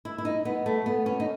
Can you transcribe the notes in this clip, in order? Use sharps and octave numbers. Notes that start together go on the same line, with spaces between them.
E4
E4
D#4
B3
A3
B3
C#4
D#4